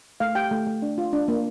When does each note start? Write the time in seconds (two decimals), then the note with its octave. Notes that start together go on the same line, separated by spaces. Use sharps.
0.20 A3 F5
0.35 G4 G5
0.51 A3
0.67 A3
0.82 D4
0.98 F4
1.13 D4
1.28 A#3